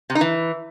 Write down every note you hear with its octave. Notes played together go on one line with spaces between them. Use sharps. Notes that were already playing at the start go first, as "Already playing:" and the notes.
C3
D#4
E3